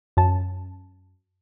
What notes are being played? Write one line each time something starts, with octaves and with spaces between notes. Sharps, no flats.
F#2 A5